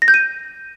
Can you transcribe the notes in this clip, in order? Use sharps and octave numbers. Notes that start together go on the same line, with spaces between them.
A#6
G6
D#7